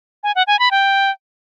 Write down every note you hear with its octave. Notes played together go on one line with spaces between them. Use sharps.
G#5
F#5
G#5
B5
G5